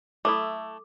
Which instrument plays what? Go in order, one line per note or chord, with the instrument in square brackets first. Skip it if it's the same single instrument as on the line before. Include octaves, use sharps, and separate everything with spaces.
[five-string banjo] A3 E4 [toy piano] A4 D6